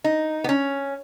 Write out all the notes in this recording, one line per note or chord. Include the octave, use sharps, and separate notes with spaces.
D#4
B3
C#4